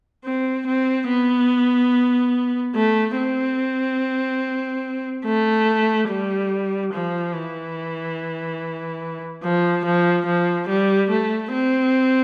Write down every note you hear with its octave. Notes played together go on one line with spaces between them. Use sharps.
C4
C4
B3
A3
C4
A3
G3
F3
E3
F3
F3
F3
G3
A3
C4